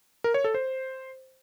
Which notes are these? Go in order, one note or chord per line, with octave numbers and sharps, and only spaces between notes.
A#4
C#5
A4
C5